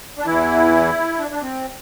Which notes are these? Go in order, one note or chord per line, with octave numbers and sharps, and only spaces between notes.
D4
E2 E3 E4
D4
D4
C4